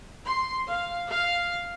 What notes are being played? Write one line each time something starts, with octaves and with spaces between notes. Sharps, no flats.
C6
F5
F5